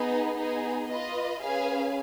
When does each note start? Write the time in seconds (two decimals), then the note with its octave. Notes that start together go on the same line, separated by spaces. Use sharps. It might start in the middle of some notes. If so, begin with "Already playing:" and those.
Already playing: B3 D#4 G#4 B4
0.35 B3 D#4 G#4
0.88 F4 B4 D#5
1.41 C#4 G#4 B4 F5 G#5